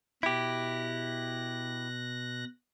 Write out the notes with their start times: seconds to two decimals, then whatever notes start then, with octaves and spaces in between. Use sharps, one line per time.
0.23 B2 E4 G4 F#6 A#6